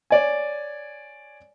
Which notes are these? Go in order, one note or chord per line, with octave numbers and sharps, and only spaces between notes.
C#5 D5 G#5